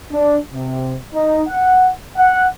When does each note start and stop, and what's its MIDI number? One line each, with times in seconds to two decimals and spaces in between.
0.12 0.38 62
0.53 0.95 48
1.14 1.42 63
1.48 1.90 78
2.17 2.47 78